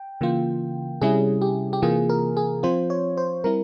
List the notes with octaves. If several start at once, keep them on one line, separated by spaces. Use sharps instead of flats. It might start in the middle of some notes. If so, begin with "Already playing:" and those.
Already playing: G5
C#3 E3 A#3 F4
C3 G3 C#4 E4 G#4
G4
G4
C3 E3 A#3 F4 G#4
A#4
G#4
F3 C4 F4 C5
C#5
C5
G3 C4 E4 A#4